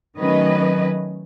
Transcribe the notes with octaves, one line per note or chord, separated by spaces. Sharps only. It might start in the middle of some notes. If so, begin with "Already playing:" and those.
D#3 F#3 A3 C#4 B4 D#5